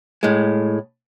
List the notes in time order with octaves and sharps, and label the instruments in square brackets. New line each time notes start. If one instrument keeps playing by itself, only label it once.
[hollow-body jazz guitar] A2 G#3